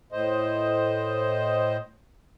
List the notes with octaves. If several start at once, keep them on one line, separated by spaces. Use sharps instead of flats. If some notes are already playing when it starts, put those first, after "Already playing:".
A2 C5 D#5